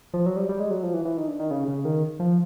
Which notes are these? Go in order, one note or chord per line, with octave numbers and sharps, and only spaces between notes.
F3
F#3
G3
G3
G#3
F#3
F3
E3
E3
D#3
D3
D#3
C#3
C#3
D#3
F3